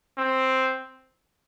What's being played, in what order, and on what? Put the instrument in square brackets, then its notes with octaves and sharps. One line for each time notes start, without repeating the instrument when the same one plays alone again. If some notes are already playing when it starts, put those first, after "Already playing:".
[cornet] C4